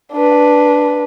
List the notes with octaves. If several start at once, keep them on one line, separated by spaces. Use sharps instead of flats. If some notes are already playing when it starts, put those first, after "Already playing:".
D4 B4